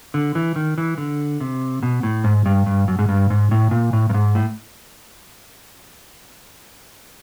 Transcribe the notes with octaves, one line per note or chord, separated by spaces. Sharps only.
D3
E3
D#3
E3
D3
C3
B2
A2
G#2
G2
G2
F#2
G#2
G2
G#2
A2
A#2
A2
G2
G#2
A2